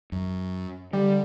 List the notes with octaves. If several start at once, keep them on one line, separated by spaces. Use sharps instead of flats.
F#2
D3 G3